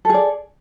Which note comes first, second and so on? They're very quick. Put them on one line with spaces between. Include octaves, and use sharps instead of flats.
A4 G#4 D5